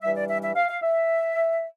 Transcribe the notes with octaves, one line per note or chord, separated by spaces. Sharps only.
G2 E3 G3 E5
D5
E5
E5
F5
F5
E5